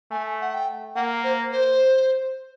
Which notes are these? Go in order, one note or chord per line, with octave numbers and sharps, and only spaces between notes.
A3 G#5
F#5
G5
A#3 F#5
C5
C5